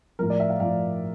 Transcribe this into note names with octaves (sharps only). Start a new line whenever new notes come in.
A2 F3 A#4
D5
E5
F5
A2 F3 F5